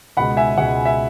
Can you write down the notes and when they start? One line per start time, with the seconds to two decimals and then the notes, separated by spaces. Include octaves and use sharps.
0.17 C#2 B2 G#3 F#5 B5
0.37 E5 G#5
0.57 C#2 B2 G#3 F#5
0.85 E5